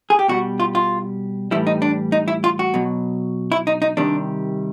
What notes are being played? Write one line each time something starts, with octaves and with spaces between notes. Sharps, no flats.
G#4
G4
B2 G3 F#4
F4
F4
A2 E3 G3 E4
D#4
D4
D#4
E4
F4
F#4
B2 F#3
E4
D#4
D#4
C3 D#3 G3 D4